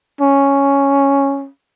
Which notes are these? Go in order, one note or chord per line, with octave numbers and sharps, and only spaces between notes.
C#4